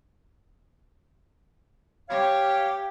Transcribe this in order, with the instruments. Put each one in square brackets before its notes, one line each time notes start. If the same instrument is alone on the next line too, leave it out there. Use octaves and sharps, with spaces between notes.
[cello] G4 [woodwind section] C#5 F5